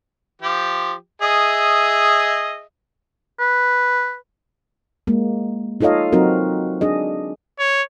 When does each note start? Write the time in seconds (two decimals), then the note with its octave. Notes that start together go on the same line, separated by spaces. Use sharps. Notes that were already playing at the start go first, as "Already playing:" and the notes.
0.42 F3 G4
1.22 G#4 D#5 E5
3.39 B4
5.07 G#3 A#3
5.81 D#4 F4 A4 C#5 D#5 F5
6.13 F#3 C4 D#4 F#4 A#4
6.81 D4 G#4 D#5
7.59 C#5